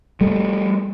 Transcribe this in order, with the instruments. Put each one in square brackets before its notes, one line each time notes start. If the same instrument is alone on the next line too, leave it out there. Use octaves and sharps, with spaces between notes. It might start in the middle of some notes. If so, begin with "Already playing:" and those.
[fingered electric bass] G3 A3